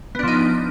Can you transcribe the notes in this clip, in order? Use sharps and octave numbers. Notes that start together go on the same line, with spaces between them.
F3 B3 D4 D#4